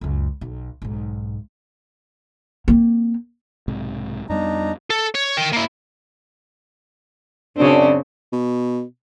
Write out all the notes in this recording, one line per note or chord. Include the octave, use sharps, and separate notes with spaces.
C#2 F#2
B1
B1 G#2
A#3 C4
B1 G#2 C3
F2 G3 B3 D4 D#4 A#5
A4
C#5
A#4 G5
A#3 E4
F#2 C#3 C4 D4
B2